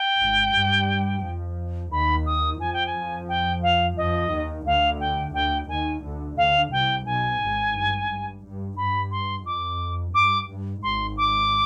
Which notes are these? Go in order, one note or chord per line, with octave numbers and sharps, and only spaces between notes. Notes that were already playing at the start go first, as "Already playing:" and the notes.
Already playing: G5
G#1 G#2
G2 G3
F2 F3
D#2 D#3 B5
D#6
F2 F3 G#5
G5
G#5
G5
F5
F2 F3 D#5
D#2 D#3
D2 D3 F5
G5
D2 D3 G5
D#2 D#3 G#5
D2 D3
D2 D3 F5
C2 C3 G5
B1 B2 G#5
G#1 G#2
G2
G2
G2
G2 B5
C6
F2 D6
G2 D6
G2
G#1 G#2 C6
D6